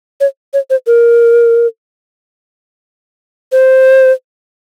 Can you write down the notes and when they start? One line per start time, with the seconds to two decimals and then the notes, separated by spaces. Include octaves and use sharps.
0.21 C#5
0.54 C#5
0.70 C5
0.87 A#4
3.52 C5